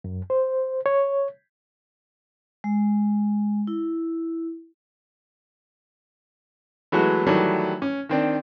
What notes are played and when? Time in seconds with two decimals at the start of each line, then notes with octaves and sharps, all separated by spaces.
0.04 F#2
0.30 C5
0.86 C#5
2.64 G#3
3.67 E4
6.92 E3 F#3 G#3 A3 B3 F#4
7.27 D#3 E3 F#3 G3 A3
7.82 C#4
8.09 D#3 C4 D4